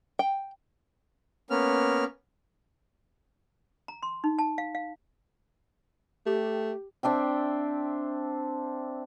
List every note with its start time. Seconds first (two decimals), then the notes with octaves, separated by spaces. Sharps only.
0.19 G5
1.50 A#3 B3 C#4 F6
3.88 A#5
4.03 C6
4.24 D#4
4.39 A5
4.58 F5
4.75 F5
6.26 A3 G4
7.03 C4 D4 E5 G5